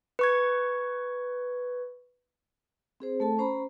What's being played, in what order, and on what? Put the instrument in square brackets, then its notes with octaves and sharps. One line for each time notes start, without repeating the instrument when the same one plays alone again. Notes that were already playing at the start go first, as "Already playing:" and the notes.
[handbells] B4 C#6 G#6
[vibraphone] C4 G#4 C5
A3 A4 A5
C#4 C5 A#5 B5